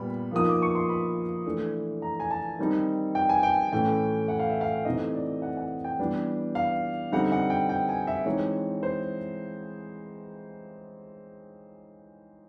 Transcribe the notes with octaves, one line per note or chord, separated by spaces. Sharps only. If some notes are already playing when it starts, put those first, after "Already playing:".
Already playing: A#2 G3 B3 B5
F3 A#3 D#4 D#6
D6
C#6
C6
B5
E3 A3 D4
A#5
G#5
A5
D#3 G3 C4 D#4
G5
G#5
G5
A2 E3 A3 C#4 G5
F#5
F5
E5
F5
C3 E3 A3 C4 D#4 D#5
D5
F#5
F#5
G5
E3 G3 B3 D4
F5
D3 G3 C4 D#4 F#5
F#5
G5
G5
G#5
E5
E3 G#3 C4 D#4 C#5
C5